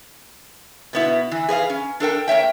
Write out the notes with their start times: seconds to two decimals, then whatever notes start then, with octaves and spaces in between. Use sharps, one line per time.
0.93 B2 B3 E4
1.31 E3
1.49 G#4 B4 D#5 F5
1.70 C#4
2.00 D4 A4 A#4 G5
2.28 A#3 C#5 E5 G5